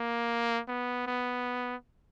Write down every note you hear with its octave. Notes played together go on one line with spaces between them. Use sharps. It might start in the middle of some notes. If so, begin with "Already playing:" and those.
Already playing: A#3
B3
B3